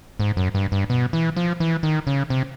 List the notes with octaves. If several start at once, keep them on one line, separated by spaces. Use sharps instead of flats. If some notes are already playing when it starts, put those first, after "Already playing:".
G#2
F#2
G2
G2
B2
E3
F3
E3
D#3
C#3
C3